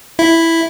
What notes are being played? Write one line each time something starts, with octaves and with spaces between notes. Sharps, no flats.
E4